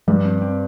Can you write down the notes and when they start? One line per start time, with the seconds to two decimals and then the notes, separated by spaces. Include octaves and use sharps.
0.08 G2 F3
0.25 C4
0.42 C4